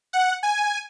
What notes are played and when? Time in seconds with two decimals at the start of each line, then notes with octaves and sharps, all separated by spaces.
0.13 F#5
0.43 G#5